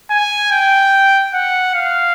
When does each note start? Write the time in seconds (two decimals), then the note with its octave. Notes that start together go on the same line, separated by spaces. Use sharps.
0.10 G#5
0.52 G5
1.34 F#5
1.75 F5